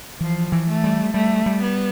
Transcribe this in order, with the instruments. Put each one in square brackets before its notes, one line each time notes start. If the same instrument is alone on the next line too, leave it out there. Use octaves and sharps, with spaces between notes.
[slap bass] E3 [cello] F3
[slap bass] E3
[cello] A3
[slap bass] G3
[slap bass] G3 [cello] A3
[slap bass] G3
[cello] B3